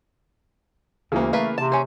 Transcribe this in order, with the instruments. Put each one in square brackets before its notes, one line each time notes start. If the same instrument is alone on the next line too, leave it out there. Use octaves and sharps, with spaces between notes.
[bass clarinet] D2 [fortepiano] C#3 E3 A#3
[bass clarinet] A3 [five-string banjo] A#4 B4 F5
[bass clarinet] C3 [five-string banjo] A5
[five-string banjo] C#4 C5